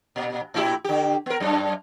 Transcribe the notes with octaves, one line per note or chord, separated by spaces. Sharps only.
A#2
A2 E4 G4
D3 G4
B3 A#4
F#2 D4